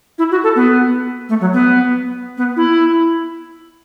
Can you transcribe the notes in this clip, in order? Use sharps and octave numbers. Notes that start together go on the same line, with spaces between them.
E4
F#4
A4
B3
A3
F#3
B3
B3
E4